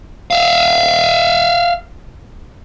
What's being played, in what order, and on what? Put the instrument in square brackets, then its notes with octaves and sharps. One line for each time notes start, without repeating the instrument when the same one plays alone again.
[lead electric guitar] E5 F5